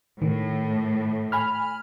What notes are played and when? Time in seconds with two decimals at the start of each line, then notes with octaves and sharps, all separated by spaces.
0.22 A2 D#3
1.32 G#5 B5 F6